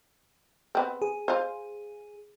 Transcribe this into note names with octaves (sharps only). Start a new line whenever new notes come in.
B3 C4
G#4
F4 C5